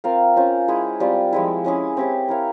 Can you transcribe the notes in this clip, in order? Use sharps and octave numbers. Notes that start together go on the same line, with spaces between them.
C4 F4 A#4 F5
C#4 F4 C5
G#3 E4 G#4
G3 C4 F4
F3 G#3 E4
G#3 C#4 E4 G#4
C4 E4 G4 C#5
E4 A#4 C#5 F5